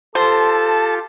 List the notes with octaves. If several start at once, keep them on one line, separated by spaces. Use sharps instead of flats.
F4 G4 A4 C5 A5